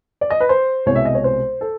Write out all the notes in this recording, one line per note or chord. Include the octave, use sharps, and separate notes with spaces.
D5
D#5
B4
C5
C2 B2 G#3 C#5
E5
D#5
C#5
C5
A4